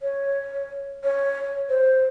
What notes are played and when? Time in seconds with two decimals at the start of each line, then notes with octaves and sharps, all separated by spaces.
0.01 C#5
1.04 C#5
1.69 C5